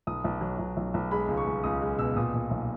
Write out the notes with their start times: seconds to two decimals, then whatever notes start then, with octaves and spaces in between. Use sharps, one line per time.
0.07 B1 D#6
0.24 B1
0.41 F#3
0.59 B1
0.77 B1
0.94 B1
1.11 G#3 B5
1.28 C#2
1.37 C#6
1.47 C#2
1.64 C#2 D#6
1.82 G#3
1.99 B2 E6
2.16 A#2 D#6
2.34 A#2
2.51 B1